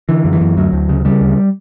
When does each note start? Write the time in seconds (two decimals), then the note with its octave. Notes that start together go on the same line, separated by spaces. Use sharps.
0.09 D3 E3
0.25 F#2
0.33 E3
0.41 F#2
0.57 D2 F#3
0.73 D2
0.89 C#3
1.05 C#3 G3
1.21 D2